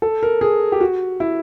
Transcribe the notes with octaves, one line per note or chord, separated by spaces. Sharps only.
A4
A#4
G#4
G4
F#4
E4